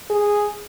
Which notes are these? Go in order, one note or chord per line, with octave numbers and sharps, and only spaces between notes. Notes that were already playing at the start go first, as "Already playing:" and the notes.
G#4